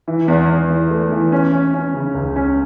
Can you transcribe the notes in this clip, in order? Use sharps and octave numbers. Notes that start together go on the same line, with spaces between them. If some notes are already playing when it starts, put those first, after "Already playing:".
E3
E2
E2
E3
A3
E3
C#4
C#4
C#4
C#3
C#2
C#4